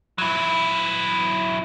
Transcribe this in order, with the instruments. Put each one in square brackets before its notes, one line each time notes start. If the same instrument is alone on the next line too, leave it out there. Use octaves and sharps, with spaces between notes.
[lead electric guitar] F#3 E4